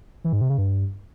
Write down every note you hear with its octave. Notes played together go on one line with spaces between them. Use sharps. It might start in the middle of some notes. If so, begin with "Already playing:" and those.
E3
G#2
C3
C#3
G2